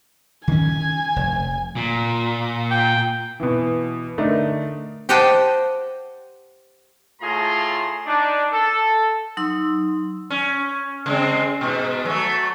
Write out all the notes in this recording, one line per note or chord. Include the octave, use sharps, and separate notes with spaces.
D#3 C#4 G#5
F1
A#2
G5
B2 E3
D3 A3 D4 D#4 A#4
G4 C5 D#5 F#5 G5 A5
A2 A3 F4 G#4 A#5 C6
D4 D#4
A4
F#3 D#4 C6 E6
C#4
C#3 G#3 C4
G#2 B2
F#3 A3